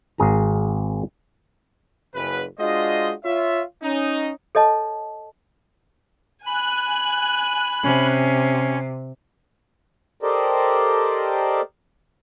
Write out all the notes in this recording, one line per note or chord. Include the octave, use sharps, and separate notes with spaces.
G#1 G#4 A#5
F#1 B4
G#3 D4 F4 F#4 C5 D#5
F4 C#5 E5
C#4 D#4
A4 C#5 D#5 A5
G#5 B5 F#6
C3 C#4
G4 A4 A#4 C5 D5 D#5